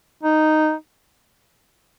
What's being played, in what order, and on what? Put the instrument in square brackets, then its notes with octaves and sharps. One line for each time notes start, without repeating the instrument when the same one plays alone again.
[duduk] D#4